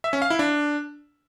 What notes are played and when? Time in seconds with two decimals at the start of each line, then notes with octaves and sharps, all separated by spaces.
0.04 E5
0.13 C#4
0.22 F5
0.30 E4
0.39 D4